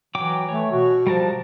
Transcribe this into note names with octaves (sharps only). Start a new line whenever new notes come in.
E3 F#3 G5 D6
E3 A3 C#5
B2 F#4
F3 G3 A#4 A5